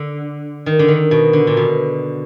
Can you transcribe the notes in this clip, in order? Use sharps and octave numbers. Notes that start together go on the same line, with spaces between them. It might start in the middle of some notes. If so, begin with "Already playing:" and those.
Already playing: D3
D#3
D3
D#3
B2
D3
A#2
B2